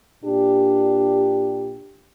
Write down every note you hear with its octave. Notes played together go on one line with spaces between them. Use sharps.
A#2 D4 G4